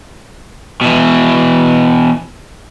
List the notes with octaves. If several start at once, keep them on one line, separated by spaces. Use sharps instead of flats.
B2 E3